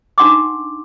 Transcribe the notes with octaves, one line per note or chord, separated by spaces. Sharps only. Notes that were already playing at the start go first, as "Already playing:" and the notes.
D4 D#4 F#5 C6 D6